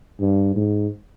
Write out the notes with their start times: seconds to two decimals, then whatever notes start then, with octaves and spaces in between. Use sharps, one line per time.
0.20 G2
0.56 G#2